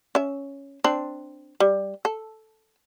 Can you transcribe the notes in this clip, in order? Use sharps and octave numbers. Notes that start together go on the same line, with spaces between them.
C#4 E5
C4 D4
G3
A4